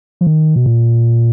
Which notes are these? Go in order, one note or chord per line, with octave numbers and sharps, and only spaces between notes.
F3
D#3
B2
A#2